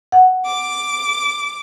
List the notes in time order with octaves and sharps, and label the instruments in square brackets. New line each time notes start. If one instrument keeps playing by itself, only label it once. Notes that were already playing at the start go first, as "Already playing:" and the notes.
[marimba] F#5
[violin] D6